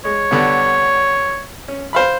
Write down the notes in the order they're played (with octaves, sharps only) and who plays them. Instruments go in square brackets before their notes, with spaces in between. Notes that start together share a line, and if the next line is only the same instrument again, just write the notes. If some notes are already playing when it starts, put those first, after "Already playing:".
[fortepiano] G#3 [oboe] C#5
[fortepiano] D3 G3 B3
C#4
C5 F5 B5